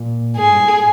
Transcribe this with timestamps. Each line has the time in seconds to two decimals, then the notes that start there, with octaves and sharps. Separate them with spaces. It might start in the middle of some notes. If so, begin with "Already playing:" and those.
Already playing: A#2
0.37 G#2 G#4
0.50 G2
0.62 G#2